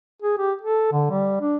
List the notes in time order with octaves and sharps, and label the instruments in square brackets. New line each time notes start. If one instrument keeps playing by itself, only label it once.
[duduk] G#4
G4
A4
D3
G3
D4